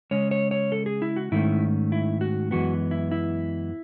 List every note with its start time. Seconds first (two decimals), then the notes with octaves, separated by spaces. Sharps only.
0.11 C#3 G#3 C#4 C#5
0.31 C#5
0.51 C#5
0.72 A4
0.86 G#4
1.02 E4
1.16 F#4
1.32 G#2 D#3 A3 C#4 E4
1.92 E4
2.21 F#4
2.51 F#2 E3 G#3 B3 F#4
2.91 E4
3.11 E4